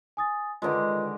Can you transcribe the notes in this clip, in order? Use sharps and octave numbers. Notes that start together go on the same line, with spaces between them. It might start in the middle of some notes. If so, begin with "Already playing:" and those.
G#5 D#6 A6
D3 D#3 G#3 F4 B4 D#5